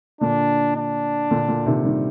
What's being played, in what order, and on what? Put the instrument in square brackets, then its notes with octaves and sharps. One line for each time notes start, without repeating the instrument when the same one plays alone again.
[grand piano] A#2 D3 [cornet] D4
[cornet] D4
[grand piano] A#2 D3
A#2 D3
C3 D#3
D#3 G3